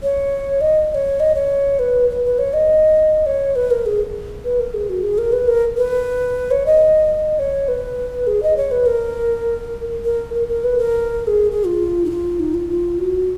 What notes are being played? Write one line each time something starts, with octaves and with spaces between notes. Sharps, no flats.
C#5
D#5
D#5
C#5
D#5
C#5
B4
B4
B4
C#5
D#5
C#5
B4
A#4
G#4
B4
A#4
G#4
F#4
G#4
A#4
B4
A#4
B4
C#5
D#5
C#5
B4
G#4
D#5
C#5
B4
A#4
A#4
A#4
A#4
B4
A#4
A#4
G#4
G#4
F4
D#4
F4
D#4
F4
F4
F#4